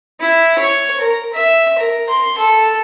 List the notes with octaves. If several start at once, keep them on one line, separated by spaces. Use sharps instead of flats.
E4
C#5
A#4
E5
A#4
C6
A4